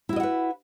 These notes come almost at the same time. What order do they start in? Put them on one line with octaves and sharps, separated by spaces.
E4 F#4 D#5 F#5 B4